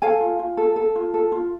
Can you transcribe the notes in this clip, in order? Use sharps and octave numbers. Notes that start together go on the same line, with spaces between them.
A4 F5 G#5
F4
F4
A4
A4
F4
A4
F4